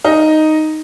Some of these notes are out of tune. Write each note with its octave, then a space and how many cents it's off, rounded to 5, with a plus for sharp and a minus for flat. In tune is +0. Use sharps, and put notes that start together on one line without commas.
D#4 +0